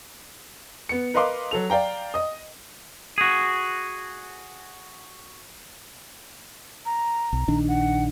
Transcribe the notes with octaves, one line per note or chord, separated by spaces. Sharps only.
B3 C#7
A#4 B4 D#5 F5 C6 D6
F#3 A4 F7
D5 F5 G5 A#5
D#5 D#6
F#4 G#4
A#5
B1
A#1 D#3 D4
F#5